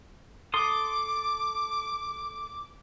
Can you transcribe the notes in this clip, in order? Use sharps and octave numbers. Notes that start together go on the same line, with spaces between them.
A4 C6 D6 D#6